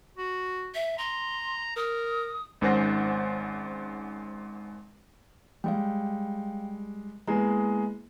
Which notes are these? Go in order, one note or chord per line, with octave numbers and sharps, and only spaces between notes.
F#4
E5
A#5 C6
A#4 D#6
G#1 G#2 C#4 C5 F#5 A#6
G3 G#3 F5 G5
G#3 A#3 B3 E4 G#4 A#5